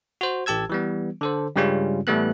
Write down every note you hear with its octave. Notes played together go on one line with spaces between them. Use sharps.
F#4 C5
A1 G4 A5 E6 G#6
E3 G3 B3
D3 A4 C5
G2 C#3 G3 G#3 C#4 F4
A2 E3 G3 A3 B3 F#6